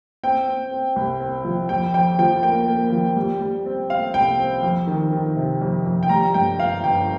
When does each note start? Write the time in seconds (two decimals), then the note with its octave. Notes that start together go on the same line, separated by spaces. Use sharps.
0.23 C4 G5
0.48 C4
0.71 C4
0.96 C2
1.20 C4
1.45 F3
1.69 F2 G5
1.94 F2 G5
2.19 F3 G5
2.43 A#3 G5
2.68 A#3
2.92 F3
3.16 G3
3.40 G3
3.66 C4
3.90 C4 F5
4.14 C2 G5
4.39 C4
4.63 F2
4.87 D#3
5.12 D#3
5.37 C3
5.62 F2
5.86 F2
6.03 G5
6.09 G3 A#5
6.34 G2 G5
6.58 G1 F5
6.84 G1 G5